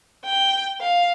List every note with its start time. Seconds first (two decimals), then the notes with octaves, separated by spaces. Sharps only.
0.25 G5
0.81 F5